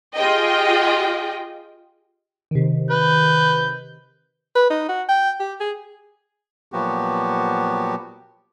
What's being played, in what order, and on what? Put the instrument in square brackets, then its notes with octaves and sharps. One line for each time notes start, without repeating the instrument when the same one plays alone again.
[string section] F4 G4 G#4 D#5 G5
[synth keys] C3 D#3
[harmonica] B4 [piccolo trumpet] G6
[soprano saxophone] B4
D#4
F#4
G5
G4
G#4
[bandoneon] A#2 F3 F#3 B3 F#4 G4